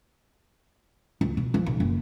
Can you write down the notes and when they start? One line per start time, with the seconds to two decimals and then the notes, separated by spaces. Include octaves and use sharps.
1.21 D2
1.37 B2
1.54 F3
1.66 B1
1.80 F#1